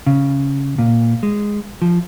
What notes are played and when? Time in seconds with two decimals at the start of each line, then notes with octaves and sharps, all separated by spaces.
0.06 C#3
0.78 A#2
1.23 G#3
1.82 F3